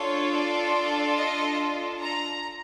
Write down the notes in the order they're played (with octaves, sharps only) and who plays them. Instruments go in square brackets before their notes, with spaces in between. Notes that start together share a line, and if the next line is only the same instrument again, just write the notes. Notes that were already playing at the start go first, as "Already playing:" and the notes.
Already playing: [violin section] D4 F4 A4 C#5
D5
D#5
A#5